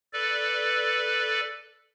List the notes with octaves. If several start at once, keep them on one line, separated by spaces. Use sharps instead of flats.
A4 B4 D5